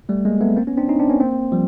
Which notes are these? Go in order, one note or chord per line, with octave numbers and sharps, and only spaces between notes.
G3 A3
G#3 A#3
A3 B3
A#3 C4
B3 C#4
C4 D4
C#4 D#4
C4 D4
B3 C#4
A#3 C4
F3 G3